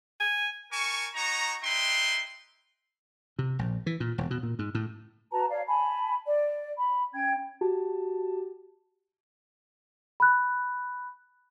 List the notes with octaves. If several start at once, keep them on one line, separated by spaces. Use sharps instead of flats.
G#5
A#4 G#5 A5 C#6
D#4 F#4 C#5 A#5
D#4 E4 B4 G5 C6
C3
A#1
E3
A#2
E1
B2
A#2
G#2
A2
F#4 B4 A5 A#5
C#5 D5 F5
G#5 A5 B5
D5
B5
C#4 G5 G#6
F#4 G4 A5
B5 F#6